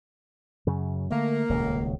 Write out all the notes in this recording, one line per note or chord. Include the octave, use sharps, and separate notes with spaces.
F#2 C#3
D3 A3 A#3
D#1 C#2 B2